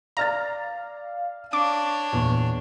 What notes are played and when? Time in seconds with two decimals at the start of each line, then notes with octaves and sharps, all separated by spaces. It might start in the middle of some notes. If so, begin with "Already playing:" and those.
0.17 D5 F5 A#5 F6 A6
1.53 D4 C#5 D6
2.13 E2 A#2